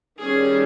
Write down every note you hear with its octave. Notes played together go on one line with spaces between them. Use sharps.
D#3 G3 C#4 G#4